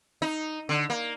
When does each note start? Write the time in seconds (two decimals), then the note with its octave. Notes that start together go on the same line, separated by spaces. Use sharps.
0.22 D#4
0.69 D3
0.90 A#3